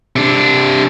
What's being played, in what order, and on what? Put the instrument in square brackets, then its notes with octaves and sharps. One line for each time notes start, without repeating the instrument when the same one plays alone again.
[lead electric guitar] C3 D4